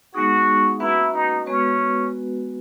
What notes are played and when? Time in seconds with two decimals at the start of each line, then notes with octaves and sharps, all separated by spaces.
0.14 G#3 B3 D#4 F#4 G#4
0.80 A#3 C#4 E4 F#4 B4 F#5
1.14 D#4
1.46 G#3 B3 C#4 F#4 B4